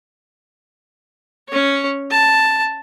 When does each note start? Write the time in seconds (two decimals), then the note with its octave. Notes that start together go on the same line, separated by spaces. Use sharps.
1.49 C#4 C#5
2.11 A5